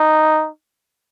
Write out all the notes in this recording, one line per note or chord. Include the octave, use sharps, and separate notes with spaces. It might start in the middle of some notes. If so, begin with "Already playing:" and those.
Already playing: D#4